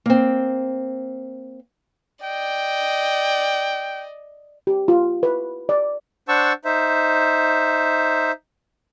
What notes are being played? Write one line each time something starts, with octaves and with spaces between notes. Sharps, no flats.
A#3 C4
D5 D#5 G5
G4
F4
B4
D5
D4 C5 F#5 A5 C#6 E6
D#4 C5 E5